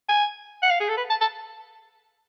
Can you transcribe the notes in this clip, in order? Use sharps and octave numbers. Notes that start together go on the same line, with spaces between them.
G#5
F#5
F5
G#4
A4
B4
A5
A5